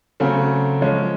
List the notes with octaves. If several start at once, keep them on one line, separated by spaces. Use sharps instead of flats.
C#3 F#3 A3 C4
F3 G#3 C#4